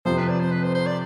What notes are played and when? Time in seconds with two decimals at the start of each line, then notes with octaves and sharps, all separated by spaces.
0.05 F2 C3 F3 C5
0.18 B4
0.29 D5
0.40 C5
0.52 B4
0.64 C5
0.75 C5
0.86 D5